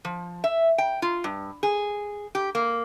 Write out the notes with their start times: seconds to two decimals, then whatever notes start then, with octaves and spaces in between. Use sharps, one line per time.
0.05 F3
0.44 E5
0.78 G5
1.02 F4
1.24 G2
1.63 G#4
2.35 G4
2.55 A#3